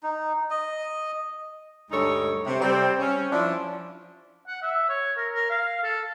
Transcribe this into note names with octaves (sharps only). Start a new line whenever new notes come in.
D#4
D#5
D2 G2 G#3 D#4 A4 C#5
C3
G3 C4
C#4
F3 D4 E4
F#5
E5
C#5
A#4
A#4
F5
A4